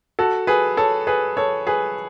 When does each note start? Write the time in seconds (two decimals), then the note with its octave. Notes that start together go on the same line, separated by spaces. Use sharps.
0.19 F#4 A4
0.47 G#4 B4
0.77 A4 C#5
1.07 G#4 B4
1.37 A4 C#5
1.67 G#4 B4